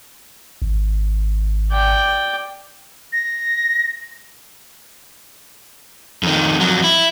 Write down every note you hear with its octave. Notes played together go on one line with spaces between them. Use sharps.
G#1
D5 G5
A#6
F2 D#3
F2 F#3
E4